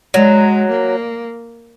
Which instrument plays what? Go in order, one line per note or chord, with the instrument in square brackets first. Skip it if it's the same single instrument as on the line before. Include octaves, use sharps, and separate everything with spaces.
[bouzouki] F#3 [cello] G#3
[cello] A#3